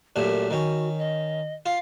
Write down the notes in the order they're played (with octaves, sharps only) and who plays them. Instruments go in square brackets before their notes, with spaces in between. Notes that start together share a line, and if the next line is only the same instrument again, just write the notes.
[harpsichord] F#2 A#2 A3 [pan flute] G4
[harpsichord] D#3 C#4 [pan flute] F#4
[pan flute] D#5
[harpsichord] F4 [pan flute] F5